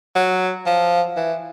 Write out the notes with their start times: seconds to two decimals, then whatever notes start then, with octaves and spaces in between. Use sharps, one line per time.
0.15 F#3
0.66 F3
1.17 E3